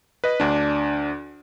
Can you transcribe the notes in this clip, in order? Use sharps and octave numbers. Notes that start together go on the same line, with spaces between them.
B4 D#5
D2 D4